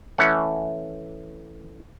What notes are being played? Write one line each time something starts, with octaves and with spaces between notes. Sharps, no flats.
E3 A3 C#4 F#5